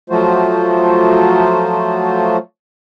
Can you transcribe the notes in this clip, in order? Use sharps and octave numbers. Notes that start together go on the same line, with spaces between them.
F3 F#3 A3 F4 F#4 C5